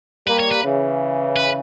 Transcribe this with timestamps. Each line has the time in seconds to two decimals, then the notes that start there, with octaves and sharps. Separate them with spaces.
0.27 G3 A#3 B4
0.40 C#5
0.52 B4
0.64 C#3 E3
1.36 B4